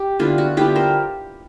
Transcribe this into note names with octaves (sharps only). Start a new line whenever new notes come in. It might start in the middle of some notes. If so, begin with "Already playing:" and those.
Already playing: G4
D3 G3 B3 E4 F4
F#4
D3 G3 B3 E4 F4 G4
A#4 C5